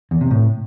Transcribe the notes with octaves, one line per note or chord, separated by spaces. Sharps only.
E2
C3
A2